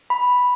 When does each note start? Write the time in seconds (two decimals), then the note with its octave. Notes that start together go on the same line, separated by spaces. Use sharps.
0.10 B5